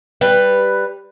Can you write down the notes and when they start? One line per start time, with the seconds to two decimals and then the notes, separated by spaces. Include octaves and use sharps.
0.21 G3 B4